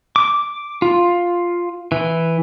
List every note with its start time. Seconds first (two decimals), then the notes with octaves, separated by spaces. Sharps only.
0.16 D6
0.82 F4
1.92 E3